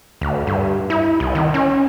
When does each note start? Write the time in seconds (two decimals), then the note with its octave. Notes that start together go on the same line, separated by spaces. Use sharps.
0.21 D2
0.47 G2
0.90 E4
1.20 C2
1.35 D#3
1.54 C#4